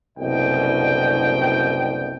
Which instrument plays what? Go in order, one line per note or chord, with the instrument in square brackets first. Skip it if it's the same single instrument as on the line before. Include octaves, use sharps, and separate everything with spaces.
[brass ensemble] F#1 C2 B2 D3 D#5 G5